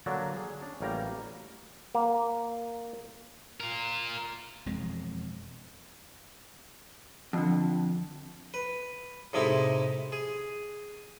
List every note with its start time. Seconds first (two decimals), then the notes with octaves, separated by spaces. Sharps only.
0.06 D3 F#3 A#3 D4
0.36 G#4
0.62 C#4 D4
0.81 A1 F#3 G3 A#3 G5 A#5
1.95 A#3
3.60 F4 A#4
4.66 E1 F2 G#3
7.33 F2 D3
8.54 B4
9.33 A2 C3 G#3 D#4 E4
10.12 G#4